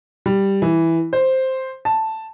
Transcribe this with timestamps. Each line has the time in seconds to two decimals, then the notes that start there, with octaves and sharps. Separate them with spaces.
0.26 G3
0.62 E3
1.13 C5
1.85 A5